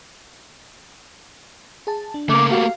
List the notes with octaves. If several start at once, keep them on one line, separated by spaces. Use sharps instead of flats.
G#4 A5
D4
C#3 A3 A#3 D6
F#4 G4 F5